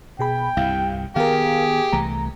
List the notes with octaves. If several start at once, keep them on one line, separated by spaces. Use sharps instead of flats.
B2 G#4 G5 B5
C2 G2 C3 E4 F5
D#3 B3 G4 G#4 A#4 F5
C2 E3 A3 A#5